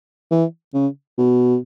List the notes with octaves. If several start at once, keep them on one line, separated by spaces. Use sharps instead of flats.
E3
C#3
B2